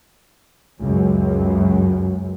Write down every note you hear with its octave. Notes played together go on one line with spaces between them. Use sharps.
C#2 F#2